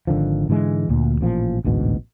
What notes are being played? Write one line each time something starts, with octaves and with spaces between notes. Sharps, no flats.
G#1 D3 D#3 F3
G#2 D3 E3 G#3
D2 A#2
A1 A#2 F3
A1 D2 G#2 B2